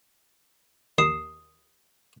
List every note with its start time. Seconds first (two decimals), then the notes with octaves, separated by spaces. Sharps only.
0.98 D#2 D#6 C7 E7